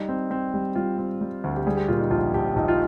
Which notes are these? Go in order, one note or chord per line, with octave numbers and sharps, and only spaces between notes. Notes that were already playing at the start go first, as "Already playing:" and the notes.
Already playing: G3 D#4
C4
C4
G3
G3 F4
C4
G3
D2
G4
G3 G#4
G4
A#2 F4
D#4
A#1 F4
A#1 G4
A#1 D#4
F4